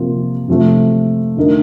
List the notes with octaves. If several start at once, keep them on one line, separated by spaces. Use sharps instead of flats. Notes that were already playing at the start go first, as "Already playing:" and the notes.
Already playing: C3 F3 A#3 F4
C3 F3 A3
D3 A3 D#4 A#4